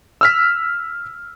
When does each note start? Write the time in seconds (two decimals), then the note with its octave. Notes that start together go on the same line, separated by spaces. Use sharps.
0.21 E6 F6 B6